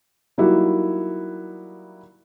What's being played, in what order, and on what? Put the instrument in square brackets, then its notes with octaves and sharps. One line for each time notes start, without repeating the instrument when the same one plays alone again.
[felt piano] F#3 G3 A#3 D#4 E4 F#4